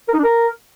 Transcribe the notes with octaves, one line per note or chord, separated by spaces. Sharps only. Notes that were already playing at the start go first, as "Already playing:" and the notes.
A#4
D#4
D4
A#4